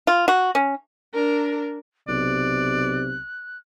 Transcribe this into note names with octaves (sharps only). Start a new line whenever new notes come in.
F4
F#4
C#4
D4 A#4
B1 C3 D5 F#6